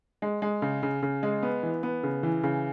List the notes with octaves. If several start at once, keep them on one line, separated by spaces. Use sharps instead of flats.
G#3
G#3
C#3
C#3
C#3
G#3
B3
E3
B3
C#3
E3
C#3